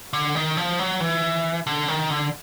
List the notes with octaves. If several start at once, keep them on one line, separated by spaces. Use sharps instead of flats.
D3
D#3
F3
F#3
E3
D3
D#3
D3